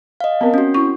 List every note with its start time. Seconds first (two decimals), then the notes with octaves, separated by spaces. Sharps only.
0.21 D#5 F5
0.41 B3 C4 A#4
0.54 C#4 F#4
0.74 E4 C#6